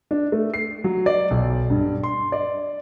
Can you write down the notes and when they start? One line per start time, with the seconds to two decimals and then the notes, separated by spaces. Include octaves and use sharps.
0.11 D4
0.32 A3
0.54 C7
0.84 F#3
1.06 D5
1.31 B1
1.70 G2
2.03 C6
2.32 D5